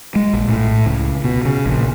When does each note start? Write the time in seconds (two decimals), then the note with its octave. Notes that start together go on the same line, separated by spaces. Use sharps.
0.16 G#3
0.33 A#1
0.49 A2
0.86 C#2
1.24 B2
1.45 C#3
1.66 A#1